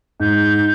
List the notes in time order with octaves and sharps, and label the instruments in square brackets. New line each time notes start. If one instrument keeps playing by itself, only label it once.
[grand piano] G#2 [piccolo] G6